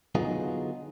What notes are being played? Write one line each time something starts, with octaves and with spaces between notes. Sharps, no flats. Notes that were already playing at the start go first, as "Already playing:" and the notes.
D3 F#3 B3 D#4 F4 G#4